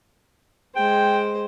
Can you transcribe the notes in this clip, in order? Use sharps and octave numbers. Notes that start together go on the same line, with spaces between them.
G#3 C5 G5